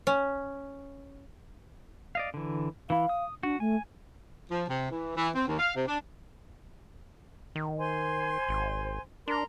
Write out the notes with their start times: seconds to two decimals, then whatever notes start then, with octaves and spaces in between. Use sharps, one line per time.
0.07 C#4
2.15 D5 D#5 F5
2.34 D3 E3
2.90 E3 E4 F5
3.09 D#6
3.43 D4 F#4
3.60 A3 G#5
4.50 F3
4.68 C3
4.90 E3
5.16 E3
5.34 C4
5.47 D#2
5.58 F5
5.75 C3
5.87 D4
7.56 D#3
7.79 C5 G#5 C6
8.49 G#1
9.28 D4 A#4 A#5 C6